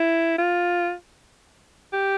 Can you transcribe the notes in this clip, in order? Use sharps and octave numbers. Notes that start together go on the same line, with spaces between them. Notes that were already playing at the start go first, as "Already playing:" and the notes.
Already playing: E4
F4
G4